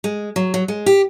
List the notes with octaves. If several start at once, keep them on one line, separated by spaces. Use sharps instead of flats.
G#3
F#3
F#3
G#3
G4